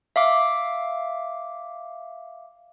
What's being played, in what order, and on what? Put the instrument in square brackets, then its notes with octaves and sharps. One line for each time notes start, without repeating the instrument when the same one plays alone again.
[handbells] E5 F5 D6